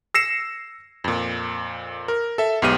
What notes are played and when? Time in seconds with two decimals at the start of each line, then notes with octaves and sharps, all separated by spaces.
0.14 E6 A#6 C7 C#7 E7
1.04 F2 A#2
2.08 A#4
2.38 A4 E5
2.62 B1 G#2 B3 G4 F6 D#7